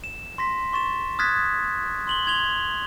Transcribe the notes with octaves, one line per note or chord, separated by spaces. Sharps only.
E7
C6 A#6 B6
C6 C#6 A6 E7
D#6 F6 F#6 G#6 A6 B6
C6 F#7 G7
C6 G#6 F7 G7